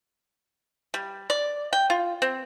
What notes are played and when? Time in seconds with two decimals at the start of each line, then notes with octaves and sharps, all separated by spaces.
0.94 G3
1.30 D5
1.73 G5
1.90 F4
2.22 C4